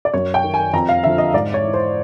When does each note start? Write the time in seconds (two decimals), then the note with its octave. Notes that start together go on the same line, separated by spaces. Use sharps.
0.05 D5
0.14 F#2 C#5
0.34 G5
0.44 D#3
0.54 G#5
0.73 F2 A#5
0.89 F5
1.04 D3 F3 E5
1.18 D#5
1.34 G#2 D5
1.54 C#5
1.64 E3
1.74 C5